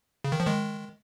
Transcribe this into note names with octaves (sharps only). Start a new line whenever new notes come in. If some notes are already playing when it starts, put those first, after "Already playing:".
C#3
D#3
F3
D#3 G#3